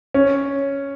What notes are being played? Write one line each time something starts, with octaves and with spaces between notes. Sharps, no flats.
C#4